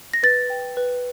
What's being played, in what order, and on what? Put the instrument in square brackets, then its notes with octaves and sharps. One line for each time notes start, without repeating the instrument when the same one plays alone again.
[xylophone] A#6
B4 A6
G5
B4